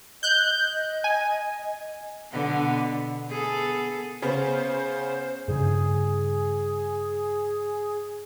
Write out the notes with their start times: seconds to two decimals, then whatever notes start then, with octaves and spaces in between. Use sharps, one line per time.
0.23 D#5 F#6 G6
1.04 G#5
2.31 B2 D3 B3
3.28 B3 G#4 A4
4.22 C#3 B3 C5
5.48 G2 C#3 G#4